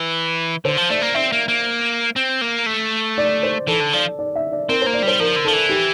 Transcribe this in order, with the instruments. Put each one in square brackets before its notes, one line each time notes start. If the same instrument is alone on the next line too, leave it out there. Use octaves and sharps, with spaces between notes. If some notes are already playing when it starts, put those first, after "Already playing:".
Already playing: [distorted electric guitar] E3
[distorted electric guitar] D3 [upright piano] C5
[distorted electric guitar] F3
[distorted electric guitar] A3 [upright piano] D5
[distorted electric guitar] A#3
[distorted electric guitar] C4 [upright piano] E5
[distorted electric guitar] A#3
A#3
C4
A#3
A3
[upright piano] D5
C5
[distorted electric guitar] E3 [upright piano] A4
[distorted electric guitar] D3
[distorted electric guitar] F3 [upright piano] D5
[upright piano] D5
E5
D5
[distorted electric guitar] C4 [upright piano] A#4
[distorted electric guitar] A#3 [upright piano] C5
[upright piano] D5
[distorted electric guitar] G3 [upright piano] C5
[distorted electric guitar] F3 [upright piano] A#4
[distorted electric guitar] D3
[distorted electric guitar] F3 [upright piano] A4
[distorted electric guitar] E3
[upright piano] G4